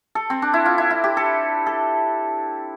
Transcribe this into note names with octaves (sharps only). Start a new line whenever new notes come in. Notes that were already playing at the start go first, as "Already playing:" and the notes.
A4
C4
D4
E4
F4
E4
E4
G4
A4
A4